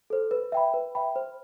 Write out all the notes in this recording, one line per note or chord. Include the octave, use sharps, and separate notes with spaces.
A4 C5
B4
E5 G5 B5
B4
E5 G5 B5
C5